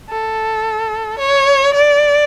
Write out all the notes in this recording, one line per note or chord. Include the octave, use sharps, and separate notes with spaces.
A4
C#5
D5